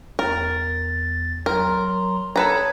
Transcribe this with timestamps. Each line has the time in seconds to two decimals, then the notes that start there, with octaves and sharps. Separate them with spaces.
0.19 E2 A#4 A6
1.46 F#3 A#4 A#5 C6
2.36 A4 B4 C#5 A#5 D#6 G#6